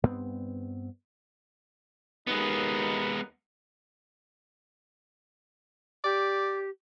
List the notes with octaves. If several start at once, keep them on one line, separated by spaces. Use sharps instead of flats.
G2 B3 C4
D#2 G#3 B3 D#4 B4
G4 D5